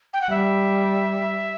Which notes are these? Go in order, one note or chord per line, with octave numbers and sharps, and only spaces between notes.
G5
F#5
G3 E5